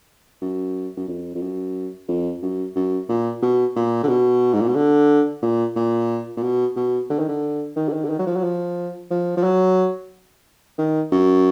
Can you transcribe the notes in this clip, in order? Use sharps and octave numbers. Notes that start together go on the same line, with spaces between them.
F#2
F#2
F2
F2
F#2
F2
F#2
F#2
A#2
B2
A#2
D3
B2
G#2
A#2
B2
D3
A#2
A#2
A#2
B2
B2
D3
D#3
D3
D#3
D3
D#3
D3
D#3
F#3
F3
F#3
F3
F3
F3
F#3
D#3
F#2